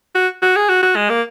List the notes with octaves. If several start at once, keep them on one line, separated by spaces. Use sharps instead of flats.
F#4
F#4
G#4
F#4
F#4
G#3
A#3